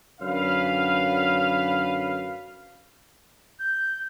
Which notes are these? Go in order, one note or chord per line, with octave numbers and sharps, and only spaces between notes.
F#2 D3 B4 F5
G6